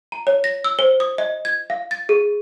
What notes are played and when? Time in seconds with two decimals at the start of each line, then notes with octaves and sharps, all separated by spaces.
0.12 A#5
0.27 C#5
0.44 A#6
0.64 E6
0.79 C5
1.00 D#6
1.18 D#5
1.45 G#6
1.70 F5
1.91 A6
2.09 G#4